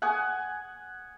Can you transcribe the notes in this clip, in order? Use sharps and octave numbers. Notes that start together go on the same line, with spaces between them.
F#5 G#5 D#6